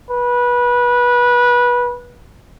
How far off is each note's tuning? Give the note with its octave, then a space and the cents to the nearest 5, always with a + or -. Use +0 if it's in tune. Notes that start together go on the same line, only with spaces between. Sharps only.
B4 -20